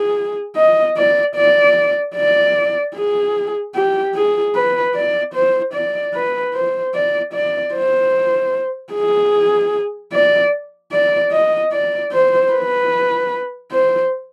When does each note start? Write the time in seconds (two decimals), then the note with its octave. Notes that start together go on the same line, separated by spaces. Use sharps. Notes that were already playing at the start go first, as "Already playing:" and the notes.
Already playing: G#4
0.56 D#5
0.97 D5
1.36 D5
2.16 D5
2.95 G#4
3.75 G4
4.15 G#4
4.55 B4
4.95 D5
5.34 C5
5.74 D5
6.14 B4
6.54 C5
6.94 D5
7.33 D5
7.74 C5
8.93 G#4
10.13 D5
10.92 D5
11.32 D#5
11.72 D5
12.12 C5
12.52 B4
13.72 C5